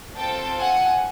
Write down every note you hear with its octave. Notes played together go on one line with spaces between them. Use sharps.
C4 F4 A4 G5 A5
F#5 G#5